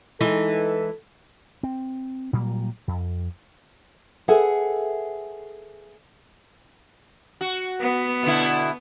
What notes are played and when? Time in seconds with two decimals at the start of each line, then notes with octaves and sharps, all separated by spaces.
0.21 E3 G#3 D#4 A4
1.63 C4
2.33 A#2 F#3 G3 A#3
2.88 F2
4.28 G#4 A4 B4 E5 F#5 G#5
7.41 F#4
7.79 B3
8.23 B2 D3 E4